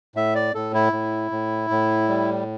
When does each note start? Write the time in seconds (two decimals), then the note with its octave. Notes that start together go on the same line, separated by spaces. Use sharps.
0.15 A2 E5
0.35 D5
0.55 A2 A4
0.74 E4
0.93 A2
1.31 A2
1.70 A2
2.09 G3